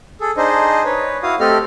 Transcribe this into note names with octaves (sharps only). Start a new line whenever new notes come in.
G#4 A4
D4 D#4 G#4 C5 D#5
B4 C#5
E4 F#4 F5 D#6
A3 C4 G4 A4 D#5 F6